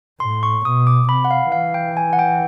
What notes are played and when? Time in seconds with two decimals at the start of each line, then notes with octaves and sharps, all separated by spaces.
0.20 A2 C6
0.43 C#6
0.65 B2 D#6
0.87 D6
1.09 C3 B5
1.25 F#5
1.31 F5
1.52 E3 F5
1.74 G5
1.97 G#5
2.13 F#5
2.19 G5